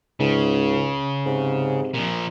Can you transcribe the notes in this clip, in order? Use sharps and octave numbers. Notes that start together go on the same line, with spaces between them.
C#2 G#2 C#3
G#2 C3
A#2 F3